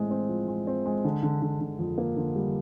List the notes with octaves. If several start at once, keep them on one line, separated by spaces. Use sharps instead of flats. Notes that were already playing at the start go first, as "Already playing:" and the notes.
Already playing: A2 G#3 C4
C4
F3
G#3
C4
G#3
D3
D3
D3
D3
F2
A#3
D3
G3